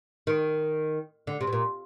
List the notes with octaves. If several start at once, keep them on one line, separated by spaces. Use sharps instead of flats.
D#3
D3
C3
B2
A#2